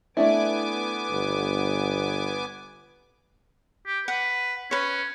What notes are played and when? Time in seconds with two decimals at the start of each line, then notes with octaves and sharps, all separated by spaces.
0.17 A3 B3 D4 E4 G#5 D6
1.11 G1
3.87 G4
4.08 B4 F#5
4.71 C#4 B4 C#5